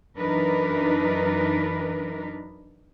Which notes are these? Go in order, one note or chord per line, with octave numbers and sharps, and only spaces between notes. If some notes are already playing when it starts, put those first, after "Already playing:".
F#2 E3 D4 D#4 A#4 B4